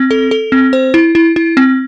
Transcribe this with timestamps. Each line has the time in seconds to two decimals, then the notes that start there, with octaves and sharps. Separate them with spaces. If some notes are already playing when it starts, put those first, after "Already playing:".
Already playing: C4
0.11 A4
0.31 A4
0.52 C4
0.73 C5
0.94 E4
1.15 E4
1.36 E4
1.57 C4